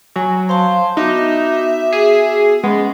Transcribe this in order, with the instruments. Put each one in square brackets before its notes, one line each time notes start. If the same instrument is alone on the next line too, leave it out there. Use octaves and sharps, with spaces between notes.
[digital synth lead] F#3 [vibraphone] G#5
[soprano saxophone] C5 [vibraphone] F5 A5
[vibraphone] B3 F#4 D6 [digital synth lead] D#4 [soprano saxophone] E5
[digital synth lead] G#4
[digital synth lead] G#3 [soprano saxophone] B3 [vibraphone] C#4